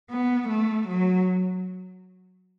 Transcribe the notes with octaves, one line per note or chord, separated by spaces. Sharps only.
B3
A3
F#3